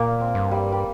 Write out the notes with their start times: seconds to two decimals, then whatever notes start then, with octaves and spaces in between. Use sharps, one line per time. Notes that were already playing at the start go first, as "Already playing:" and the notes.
Already playing: A#2 A#3
0.20 C4
0.35 G2
0.51 G3
0.72 G3